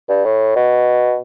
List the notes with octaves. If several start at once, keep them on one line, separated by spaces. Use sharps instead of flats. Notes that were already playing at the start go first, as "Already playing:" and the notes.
G2
A2
B2